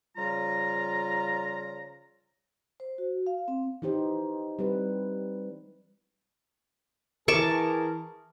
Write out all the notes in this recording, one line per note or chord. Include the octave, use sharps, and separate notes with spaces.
C#3 F3 G3 F4 A#5
C5
F#4
F5
C4
E3 D#4 G4 C5
G3 C4 B4
E3 G#4 A#4 A5 C#6 D6